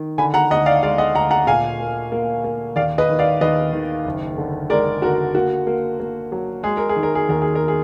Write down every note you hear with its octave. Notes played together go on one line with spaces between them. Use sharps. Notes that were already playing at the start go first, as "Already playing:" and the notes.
Already playing: D#3
D3 G#5 B5
F#5 A#5
D2 D#5 F#5
D5 F5
G#3 D5 F5
D#5 F#5
D2 F#5 A#5
F#5 A#5
A#2 F5 G#5
A#3
A#3
A#3
D#2 D5 F5
B4 D#5
D#3
D5 F5
D#2 B4 D#5
D#3
F#1
D3
G#3 A#4 D5
D3 F#4 A#4
A#3 F#4
A#3
A#3
F#3
G#3 G#4
A#4
G#4
D#3
A#4
G#4
D#2 A#4
G#4
A#4
G#4